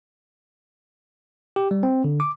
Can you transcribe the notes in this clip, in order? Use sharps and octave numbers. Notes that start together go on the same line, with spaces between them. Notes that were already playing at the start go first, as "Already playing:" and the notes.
G4
G3
C4
D3
D6